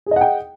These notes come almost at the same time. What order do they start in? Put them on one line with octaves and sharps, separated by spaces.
G#4 D#5 F#5 G5